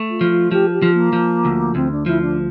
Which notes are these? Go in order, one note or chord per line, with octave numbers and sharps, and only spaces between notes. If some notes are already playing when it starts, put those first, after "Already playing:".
Already playing: A3
F4
F3
F4
F3 G4
A4
G4
F3
A#3
F3
D2
D2 C4
D4
F3 E4
D4